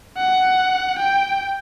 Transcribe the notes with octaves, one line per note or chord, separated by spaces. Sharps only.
F#5
G5